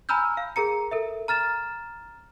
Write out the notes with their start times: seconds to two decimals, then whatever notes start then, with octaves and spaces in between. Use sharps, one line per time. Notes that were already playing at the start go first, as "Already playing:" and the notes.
0.09 G#5 A#5 B5 E6 F6 G6
0.37 F5
0.56 G#4 A#4 A#5 C#7
0.91 A4 A#4 E5
1.28 A#5 F6 A6 E7